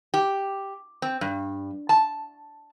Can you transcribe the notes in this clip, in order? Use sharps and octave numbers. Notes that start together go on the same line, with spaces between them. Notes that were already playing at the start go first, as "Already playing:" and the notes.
G4
C4
G2
A5